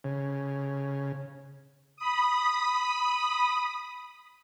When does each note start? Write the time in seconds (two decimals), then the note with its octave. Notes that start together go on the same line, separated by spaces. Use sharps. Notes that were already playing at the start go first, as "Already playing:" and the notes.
0.04 C#3
1.96 B5 D#6